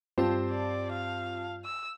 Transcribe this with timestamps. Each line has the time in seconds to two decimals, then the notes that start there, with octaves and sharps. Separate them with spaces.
0.18 G2 C4 F4 G4 C5 A5
0.50 D5
0.92 F5
1.65 E6